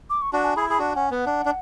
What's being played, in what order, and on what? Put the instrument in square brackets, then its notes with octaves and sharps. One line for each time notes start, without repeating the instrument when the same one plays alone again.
[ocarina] D6
C#6
[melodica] D4 F#4 [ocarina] A5
[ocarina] G#5
[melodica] E4 G#4 [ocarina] B5
[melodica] G#4 [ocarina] B5
[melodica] D4 F#4 [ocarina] F#5
[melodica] C#4 [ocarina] F#5
[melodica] B3 [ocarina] F#5
[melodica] D4
D4